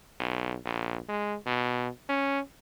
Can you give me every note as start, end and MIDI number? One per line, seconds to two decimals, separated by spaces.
0.20 0.56 35
0.65 0.98 34
1.09 1.36 56
1.47 1.89 47
2.09 2.40 61